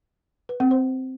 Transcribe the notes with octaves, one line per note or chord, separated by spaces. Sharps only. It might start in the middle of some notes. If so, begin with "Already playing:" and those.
B4
C4
C5